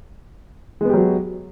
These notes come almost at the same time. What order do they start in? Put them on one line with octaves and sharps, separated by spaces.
G#3 B3 G4 F#3 F#4